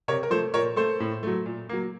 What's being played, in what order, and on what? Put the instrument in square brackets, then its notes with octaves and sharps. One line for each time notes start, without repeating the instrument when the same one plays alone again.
[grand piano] C3 A#4 C#5
A#4
F3 A3 A4 C5
A#2 A#4 C#5
A3 A4 C5
A2
F#3 A3
A#2
F#3 A#3